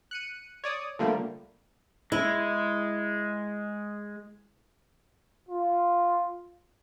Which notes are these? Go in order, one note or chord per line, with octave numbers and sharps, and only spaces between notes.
F#6 C#7 D#7
C#5 D5 D#6
D3 F3 G3 A3 A#3
G#3 E4
F4